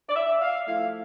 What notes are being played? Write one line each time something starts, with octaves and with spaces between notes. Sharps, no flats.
D5
E5
F5
F3 A3 E4 F5